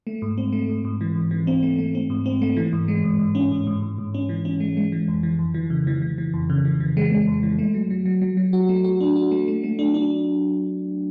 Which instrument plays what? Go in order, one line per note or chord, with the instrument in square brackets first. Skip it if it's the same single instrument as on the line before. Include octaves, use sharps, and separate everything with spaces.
[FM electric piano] A3
G#2
C4
A3
G#2
G#2
E3
G#2
E3
C4
A3
A3
C4
G#2
C4
A3
E3
G#2
G#3
G#2
G#2
C#4
G#2
G#2
G#2
G#2
C#4
E3
C#4
G#3
G#3
E3
F2
E3
F2
E3
C#3
E3
E3
E3
F2
C#3
E3
E3
G#3
G#3
F2
E3
A3
F#3
F#3
F#3
F#3
F#3
F#4
A3
F#4
D4
F#4
A3
A3
A3
D4
D4